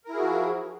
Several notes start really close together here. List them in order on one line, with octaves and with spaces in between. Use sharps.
A#4 E4 G#4 F#4 F3